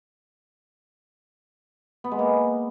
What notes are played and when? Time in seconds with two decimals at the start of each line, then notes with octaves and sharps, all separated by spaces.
2.04 B3
2.11 G#3
2.19 A#3